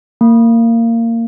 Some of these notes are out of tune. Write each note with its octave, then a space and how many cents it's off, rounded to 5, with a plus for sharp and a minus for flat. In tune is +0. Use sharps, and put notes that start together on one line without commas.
A#3 -20